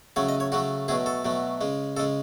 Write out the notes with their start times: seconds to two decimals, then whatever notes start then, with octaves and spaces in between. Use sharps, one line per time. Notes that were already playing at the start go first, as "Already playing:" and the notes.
0.16 C#3 F#3 A3 C#5
0.29 D#5
0.40 C#5
0.52 C#3 F#3 A3 F#4
0.88 B2 F#3 A3 G#4
1.06 A4
1.25 B2 F#3 A3
1.61 C#3 G#3
1.97 C#3 G#3 A4